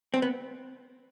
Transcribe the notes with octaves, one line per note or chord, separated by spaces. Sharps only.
C4
B3